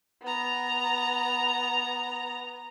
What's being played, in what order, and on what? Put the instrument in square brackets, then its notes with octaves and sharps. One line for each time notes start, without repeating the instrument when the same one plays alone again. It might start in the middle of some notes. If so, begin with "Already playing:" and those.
[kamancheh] B3 A#5